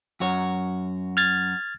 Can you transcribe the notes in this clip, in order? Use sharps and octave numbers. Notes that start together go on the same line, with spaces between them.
F#2 F#4 C#5
F6 G#6 A6